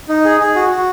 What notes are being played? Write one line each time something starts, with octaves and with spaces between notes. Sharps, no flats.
D#4
G#4
G#4
F#4
F#4